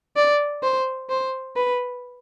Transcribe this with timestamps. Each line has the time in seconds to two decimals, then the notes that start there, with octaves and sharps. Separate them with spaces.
0.16 D5
0.63 C5
1.10 C5
1.56 B4